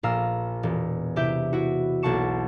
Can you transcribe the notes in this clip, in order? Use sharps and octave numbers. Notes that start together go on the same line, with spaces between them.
A#1 A#2 F5 A#5 E6
E1
C3 E4 G4 E5 G6
E4 F#4
B1 A#3 F#5 A5 C#6 E7